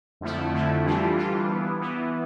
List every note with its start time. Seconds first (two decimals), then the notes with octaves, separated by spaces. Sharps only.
0.21 F2 D3 F3 A3 E4
0.52 F2 D3 F3 A3 E4
0.85 E3 G3 D4 F4
1.16 E3 G3 D4 F4
1.49 E3 B3 E4
1.81 E3 B3 E4